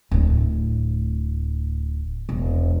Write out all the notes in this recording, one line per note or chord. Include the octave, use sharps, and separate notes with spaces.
D1 A2
E1